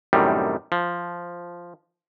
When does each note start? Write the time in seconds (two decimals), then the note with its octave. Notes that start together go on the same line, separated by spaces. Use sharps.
0.13 F#2 A2 C3 D#3 G3
0.72 F3